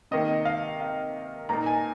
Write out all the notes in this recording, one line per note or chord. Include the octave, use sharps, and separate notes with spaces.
C3 D#3 A#3 D#5
F5
F5
A#2 A#3 D#4 A#5
G#5